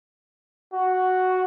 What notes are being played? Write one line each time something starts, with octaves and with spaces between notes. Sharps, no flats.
F#4